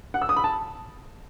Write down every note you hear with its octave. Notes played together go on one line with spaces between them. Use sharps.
F#5
E6
D#6
B5
A5